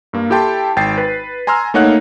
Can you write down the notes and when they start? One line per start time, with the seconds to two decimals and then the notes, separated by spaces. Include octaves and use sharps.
0.13 G2 A#3
0.30 E4 G4 A4 G5 A5 C6
0.76 G#1 G5 A6 C7
0.98 B4
1.47 G#5 A#5 C6 E6 F6
1.74 A3 A#3 D#4 C#5 F#5 F#6